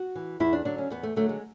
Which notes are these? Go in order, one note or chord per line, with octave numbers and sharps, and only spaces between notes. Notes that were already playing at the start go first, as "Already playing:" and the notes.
Already playing: F#4
E3
E2 E4
D4
D3 F#3 D4
C#4
E2 B3
A3
D3 F#3 A3
G#3